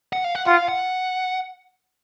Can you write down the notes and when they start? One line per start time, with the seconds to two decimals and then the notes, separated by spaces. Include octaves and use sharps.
0.13 F#5
0.24 F5
0.35 F#5
0.47 F4 F#5
0.57 F5
0.69 F#5